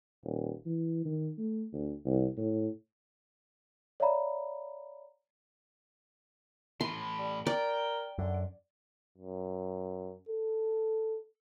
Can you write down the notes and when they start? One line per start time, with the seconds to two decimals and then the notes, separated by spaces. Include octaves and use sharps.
0.24 D#1
0.66 E3
1.05 D#3
1.38 A3
1.73 D2
2.06 C2
2.37 A2
4.00 C#5 D5 E5 F5 A#5 B5
6.81 A2 E3 C6
7.19 G3
7.47 A#4 D5 G5
8.18 F#2 D3
9.18 F#2
10.29 A4